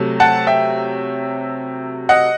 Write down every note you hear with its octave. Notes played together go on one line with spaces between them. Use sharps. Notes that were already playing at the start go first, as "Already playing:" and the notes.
Already playing: C3 F#3 A3
F#5 A5
E5 G5
D#5 F#5